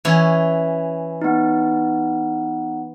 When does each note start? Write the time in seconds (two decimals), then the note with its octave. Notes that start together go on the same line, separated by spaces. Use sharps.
0.05 E3 C#4
1.22 B3 D#4